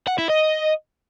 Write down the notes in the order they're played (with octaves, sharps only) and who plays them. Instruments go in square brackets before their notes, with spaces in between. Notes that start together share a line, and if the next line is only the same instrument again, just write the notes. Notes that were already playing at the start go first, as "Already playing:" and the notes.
[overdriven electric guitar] F#5
E4
D#5